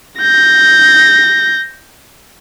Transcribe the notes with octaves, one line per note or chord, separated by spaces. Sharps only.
G6 A#6